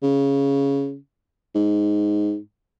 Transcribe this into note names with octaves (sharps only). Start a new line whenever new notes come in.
C#3
G#2